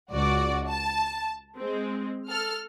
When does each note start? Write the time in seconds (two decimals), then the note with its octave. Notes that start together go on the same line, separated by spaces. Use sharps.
0.11 C#2 F#4 D5
0.68 A5
1.57 G#3 C4
2.30 A4 F6